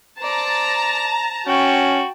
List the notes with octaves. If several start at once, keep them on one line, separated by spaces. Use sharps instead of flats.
C5 D5 A5 A#5
C#4 F#4 G5 A5